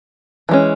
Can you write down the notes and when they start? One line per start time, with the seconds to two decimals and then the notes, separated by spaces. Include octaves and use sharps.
0.49 E3 G#3 C#4